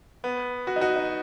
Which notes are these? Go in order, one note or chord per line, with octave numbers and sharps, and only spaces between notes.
B3
F#4
D#4
F#4
D#4